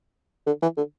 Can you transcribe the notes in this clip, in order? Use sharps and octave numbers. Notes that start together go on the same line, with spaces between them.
D3
E3
D3